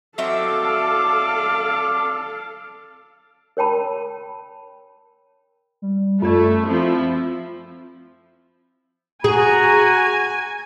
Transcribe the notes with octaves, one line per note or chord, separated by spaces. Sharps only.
F#3 C4 A4 D5 E5 F5 D6
A#4 C#5 G5 A5 B5
G3
F#2 A3 F4 D5
F3 C4 E4
F#4 G#4 G#5 A#5